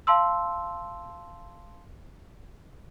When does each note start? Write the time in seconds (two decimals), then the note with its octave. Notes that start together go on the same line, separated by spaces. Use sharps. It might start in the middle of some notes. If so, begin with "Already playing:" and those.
0.07 F5 A5 C6 E6